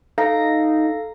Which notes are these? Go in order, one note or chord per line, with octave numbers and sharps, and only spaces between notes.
D#4 A4 F5 A#5 A#6